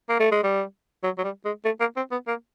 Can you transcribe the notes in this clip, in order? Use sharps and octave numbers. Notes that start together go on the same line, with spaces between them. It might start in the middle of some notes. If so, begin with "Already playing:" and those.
A#3
A3
G#3
G3
F#3
F#3
G3
G#3
A3
A#3
C4
B3
A#3